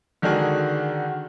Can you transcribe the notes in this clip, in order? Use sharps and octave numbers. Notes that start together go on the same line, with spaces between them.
D3 D#3 G#3 D4 F#4 G#4